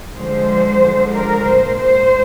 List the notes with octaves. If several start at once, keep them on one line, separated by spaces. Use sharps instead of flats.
D3 F3 G#3 C5
D3 F3 G#3
A#4
A#2 G#3 C5
C5